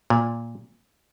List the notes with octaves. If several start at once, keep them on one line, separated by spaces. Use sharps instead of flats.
A#2